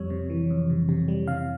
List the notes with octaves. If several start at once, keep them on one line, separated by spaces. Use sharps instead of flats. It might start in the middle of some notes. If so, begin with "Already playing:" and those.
Already playing: F2 G3 C#5
C3
E3
F2
C3
C3
G3
C3 F5